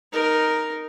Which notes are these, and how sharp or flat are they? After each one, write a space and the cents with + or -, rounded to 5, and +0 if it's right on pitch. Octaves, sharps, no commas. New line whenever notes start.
D#4 +0 A#4 +0